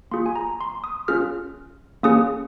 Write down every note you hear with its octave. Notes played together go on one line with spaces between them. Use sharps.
A#3 F4 G#4 C6
G#5
A#5
C6
D#6
C#4 F4 G#4 F6
A#3 C#4 G#4 D#6